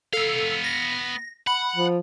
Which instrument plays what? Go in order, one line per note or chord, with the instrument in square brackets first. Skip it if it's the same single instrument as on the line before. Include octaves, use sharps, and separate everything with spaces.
[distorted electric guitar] B3 F5 [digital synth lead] A4
[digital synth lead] A#6
[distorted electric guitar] F#5 [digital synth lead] B5
[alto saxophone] F3